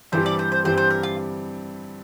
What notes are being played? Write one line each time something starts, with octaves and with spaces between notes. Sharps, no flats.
G2 E3 G3 C4 G4 C5
D5
C5
C5
G2 E3 G3 C4 G4 C5
C5
A#4
F4